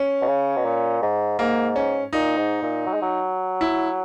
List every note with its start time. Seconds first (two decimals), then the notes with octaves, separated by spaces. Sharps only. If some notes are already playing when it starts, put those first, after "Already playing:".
Already playing: C#4
0.21 B2
0.28 C#3
0.57 B2
0.65 A#2
1.02 G#2
1.39 G#2 A#3
1.76 C#4
2.13 A#2 D#4
2.37 G#2
2.62 A#2
2.86 F#3
2.94 G#3
3.02 F#3
3.61 E4